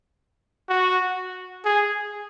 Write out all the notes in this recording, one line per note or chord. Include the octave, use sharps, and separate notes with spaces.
F#4
G#4